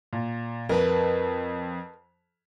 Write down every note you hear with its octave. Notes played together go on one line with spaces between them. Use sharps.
A#2
F2 A#4 B4 A5